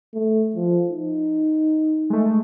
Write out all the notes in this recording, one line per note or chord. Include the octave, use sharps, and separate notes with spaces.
A3
F3
D#4
G#3 A3